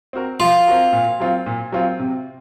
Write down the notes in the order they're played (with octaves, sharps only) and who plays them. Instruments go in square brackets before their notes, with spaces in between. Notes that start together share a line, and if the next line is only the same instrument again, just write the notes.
[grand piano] C4 F#4 A#4
[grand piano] F3 [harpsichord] F4
[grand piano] C4 F#4 A#4
A#2
F#3 C4 F4
A#2
F#3 C4 F4
C3